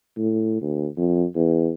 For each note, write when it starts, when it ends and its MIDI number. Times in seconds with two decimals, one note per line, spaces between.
0.18 0.57 45
0.62 0.87 38
0.97 1.24 41
1.36 1.71 40